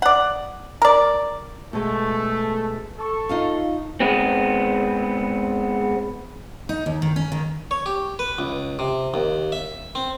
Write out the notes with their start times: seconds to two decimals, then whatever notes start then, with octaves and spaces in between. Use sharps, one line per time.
0.02 D5 F#5
0.82 A#4 D5
1.73 B2 G#3 A3
2.98 A4 C#6
3.29 D#4 F4 F5
4.00 G#3 B3 C4
6.69 D#4
6.86 D#2
7.02 D#3
7.16 C#4
7.32 D#3
7.71 C#5
7.86 G4
8.19 B4
8.39 C#2
8.79 C3
9.14 D#2
9.52 E5
9.95 C4